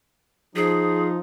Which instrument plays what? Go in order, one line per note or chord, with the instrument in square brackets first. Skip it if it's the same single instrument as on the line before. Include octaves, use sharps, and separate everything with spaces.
[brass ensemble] F3 [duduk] D#4 [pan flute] G#4